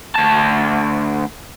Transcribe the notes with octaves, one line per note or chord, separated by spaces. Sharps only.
D2 A5